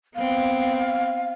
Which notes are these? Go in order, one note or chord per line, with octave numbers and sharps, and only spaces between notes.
B3 C4 F5